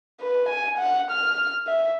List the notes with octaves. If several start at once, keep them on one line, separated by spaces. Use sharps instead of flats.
B4
G#5
F#5
F6
E5